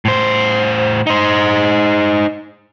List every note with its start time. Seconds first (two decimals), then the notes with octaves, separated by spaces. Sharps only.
0.05 A2 C5
1.07 D#4 C5